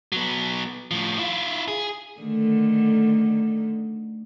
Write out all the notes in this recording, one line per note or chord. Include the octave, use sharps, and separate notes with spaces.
F#3 B3
A2 F3
E4 F4
G#4
D3 D#3 A3